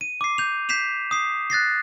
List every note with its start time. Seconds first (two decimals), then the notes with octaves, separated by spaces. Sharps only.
0.01 D#7
0.21 D6 C7
0.38 G6 F7
0.69 G6 B6 C7 E7 F7
1.11 D#6 C7
1.50 F#6 A6 A#6 C7